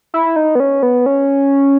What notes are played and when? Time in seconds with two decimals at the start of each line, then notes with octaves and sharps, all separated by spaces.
0.14 E4
0.36 D#4
0.55 B3
0.60 C#4
0.83 B3
1.06 C#4